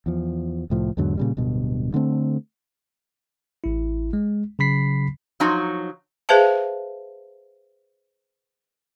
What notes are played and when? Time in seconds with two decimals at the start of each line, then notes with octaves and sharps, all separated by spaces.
0.06 E2 F3
0.70 C2 A2 F3
0.97 E2 G#2 D3 F#3
1.17 A#2 C#3 G3
1.37 D1 G2 B2
1.94 D3 A3 C4
3.64 A1 E4
4.13 G#3
4.59 C#3 F#3 B5 B6 C7
5.40 F3 F#3 D#4 F#4
6.29 G#4 B4 C5 E5 F5 A5